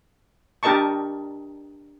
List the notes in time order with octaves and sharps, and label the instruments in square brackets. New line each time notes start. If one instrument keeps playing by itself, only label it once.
[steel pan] D4 G4 A#4 D#5 A5 C#6